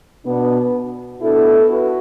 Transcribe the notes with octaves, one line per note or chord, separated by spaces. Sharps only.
B2 B3 D4
B2 B3 D4 E4 A4
F#4 B4